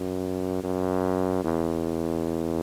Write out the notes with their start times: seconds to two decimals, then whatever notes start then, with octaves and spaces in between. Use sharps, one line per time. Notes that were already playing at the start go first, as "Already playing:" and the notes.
Already playing: F#2
0.63 F#2
1.44 E2